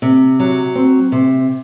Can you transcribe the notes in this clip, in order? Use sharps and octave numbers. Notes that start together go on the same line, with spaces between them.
C3
F#3
C4
C3